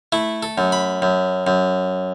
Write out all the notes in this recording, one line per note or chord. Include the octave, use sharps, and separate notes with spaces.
A3 E4
A4
F#2
B5
F#2
F#2